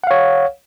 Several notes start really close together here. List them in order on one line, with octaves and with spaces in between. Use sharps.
F#5 F5 C#5